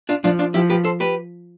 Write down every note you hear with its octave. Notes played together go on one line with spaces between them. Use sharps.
D4 F4
F3 D4 F4
D4 F4
F3 E4 G4
G4 B4
A4 C5
G4 B4